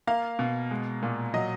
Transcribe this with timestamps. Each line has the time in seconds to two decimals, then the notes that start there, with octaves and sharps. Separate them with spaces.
0.07 A#3 F5
0.39 B2
0.71 G#3
1.03 A#2
1.34 F#3 D#5